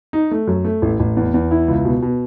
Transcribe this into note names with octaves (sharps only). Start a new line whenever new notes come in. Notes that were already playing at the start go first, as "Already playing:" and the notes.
D#4
A3
F#2
A3
A1
A1
E2
E2
E4
C#2
B2
B2